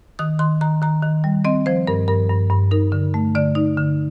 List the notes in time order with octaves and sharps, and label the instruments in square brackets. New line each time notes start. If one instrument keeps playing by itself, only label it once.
[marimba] D#3 D#6
D#3 C6
D#3 A#5
D#3 A#5
D#3
G3
C4 D#5
F3 C5
G2 A#4
G2 A#4
G2
G2
D#4 A#4
D3
A3
D3 D5
D#4
D3